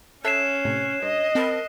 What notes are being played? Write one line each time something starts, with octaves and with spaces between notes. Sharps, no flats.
C#4 A4 C#5 E5 F#6 C7 E7
A2 C3
G2 D#5
C4 A#4 A5 B5